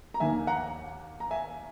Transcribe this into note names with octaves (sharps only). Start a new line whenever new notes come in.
A#5
D#2 D#3 A#3 E5 G#5
F#5 A#5
A#5
E5 G#5